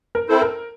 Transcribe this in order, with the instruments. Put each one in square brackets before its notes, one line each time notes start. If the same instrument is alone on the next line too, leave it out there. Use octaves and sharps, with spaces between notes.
[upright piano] A#4
[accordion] C4 E4 A4 C5
[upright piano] A#4